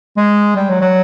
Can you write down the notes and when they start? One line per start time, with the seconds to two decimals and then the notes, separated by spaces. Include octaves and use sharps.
0.17 G#3
0.56 G3
0.69 F#3
0.81 F#3